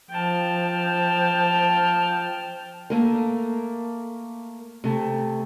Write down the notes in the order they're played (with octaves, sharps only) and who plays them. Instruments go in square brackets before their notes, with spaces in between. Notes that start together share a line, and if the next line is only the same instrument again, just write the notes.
[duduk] F3 [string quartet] G5 A5 F6
[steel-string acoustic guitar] A3 A#3 A#4
C3 A3